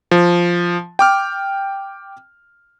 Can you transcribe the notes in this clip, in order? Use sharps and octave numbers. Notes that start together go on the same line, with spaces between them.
F3
G5 D6 F6